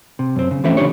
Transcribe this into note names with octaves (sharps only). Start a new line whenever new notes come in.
C3
F#2 C4
C#3
E3 F3 A3 C4 C#4 E5
D3 F3 D4 G4 C#5